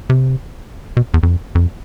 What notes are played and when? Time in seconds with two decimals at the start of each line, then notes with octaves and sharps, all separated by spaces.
0.10 C3
0.97 B2
1.14 E2
1.23 F2
1.55 F2